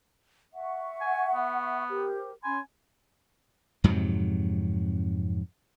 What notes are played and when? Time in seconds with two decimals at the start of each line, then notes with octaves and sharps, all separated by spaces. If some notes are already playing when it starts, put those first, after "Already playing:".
0.54 E5 F#5 C#6
1.01 G#5
1.35 B3
1.90 G4 A#4 C5
2.44 C#4 G#5 B5 C6
3.84 F2 G#2 C3 F#3